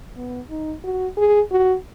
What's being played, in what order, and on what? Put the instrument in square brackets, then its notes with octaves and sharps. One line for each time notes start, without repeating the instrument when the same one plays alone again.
[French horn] B3
D#4
F#4
G#4
F#4